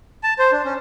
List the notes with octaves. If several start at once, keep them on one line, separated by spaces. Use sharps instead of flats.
A5
C5
D4
C#4